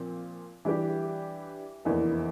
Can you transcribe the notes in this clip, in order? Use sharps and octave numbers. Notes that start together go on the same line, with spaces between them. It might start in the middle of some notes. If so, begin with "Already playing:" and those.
Already playing: A#2 F3 C4
E3 G3 D4 G4
F1 E2 E3 A#3 D4